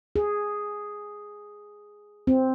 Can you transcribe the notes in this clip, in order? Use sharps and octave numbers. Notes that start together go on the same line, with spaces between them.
G#4
C4